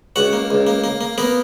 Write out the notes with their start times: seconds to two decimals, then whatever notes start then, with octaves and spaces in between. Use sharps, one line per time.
0.16 C#2 F#4 F#5
0.33 A#3
0.51 C#2
0.67 A#3
0.84 A#3
1.01 A#3
1.18 A#3 B3 A#4